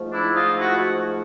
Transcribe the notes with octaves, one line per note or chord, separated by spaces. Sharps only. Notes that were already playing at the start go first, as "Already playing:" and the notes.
Already playing: G#2 F3 A3
D4 E4
D#4 F4
E4 F#4